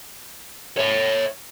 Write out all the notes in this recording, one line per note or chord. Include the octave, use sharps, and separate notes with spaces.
C#5 E5